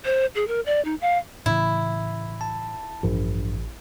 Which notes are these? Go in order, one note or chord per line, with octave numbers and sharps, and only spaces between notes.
C5
G#4
A#4
D5
D#4
F5
A2 C#3 E3 E4
A5
A1 G2 F3 D4